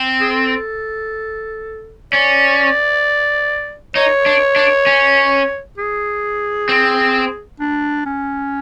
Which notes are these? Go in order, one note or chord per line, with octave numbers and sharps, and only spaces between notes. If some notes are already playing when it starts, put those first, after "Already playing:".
Already playing: C4
G#4
A4
C#4 D5
D#4 C#5
D4
D4
C#4
G#4
C4
D4
C#4